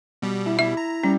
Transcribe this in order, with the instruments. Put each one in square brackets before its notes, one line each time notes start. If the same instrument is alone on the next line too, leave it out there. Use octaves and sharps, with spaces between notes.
[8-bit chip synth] B2 G3
[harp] E4
[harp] E4 [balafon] E5
[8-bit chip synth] A#5
[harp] G3 [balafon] C#4